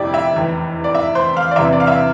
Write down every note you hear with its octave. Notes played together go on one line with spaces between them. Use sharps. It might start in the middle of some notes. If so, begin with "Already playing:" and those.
Already playing: F1 F2 C3 D4 E4 G4 D5
E5
F1 E2 E3
D5
E5
C5
F5
D5
E1 E2 C3 E3 E5
D5
F5
E5